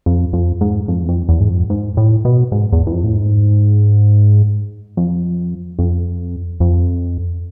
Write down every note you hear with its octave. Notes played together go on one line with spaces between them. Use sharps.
F2
F2
G#2
F2
E2
F2
E2
G#2
F2
G#2
A2
B2
G#2
E2
E2
F2
A2
G#2
F2
F2
F2